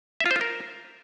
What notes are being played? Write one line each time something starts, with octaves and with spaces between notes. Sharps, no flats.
E5
F4
C5
F4
A#4